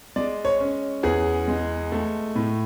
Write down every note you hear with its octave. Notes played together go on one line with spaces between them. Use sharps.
G#3 D5
C#5
C#4
E2 G#4
G#3
A3
A2